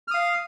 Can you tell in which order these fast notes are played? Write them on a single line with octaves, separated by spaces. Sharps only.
F6 D#6 F5